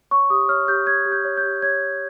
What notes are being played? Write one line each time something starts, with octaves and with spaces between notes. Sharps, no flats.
C#5 C#6
G4 D#6
C#5 F6
G4 G6
C#5 G#6
G4
G6
C#5
G6
G4
C#5 G#6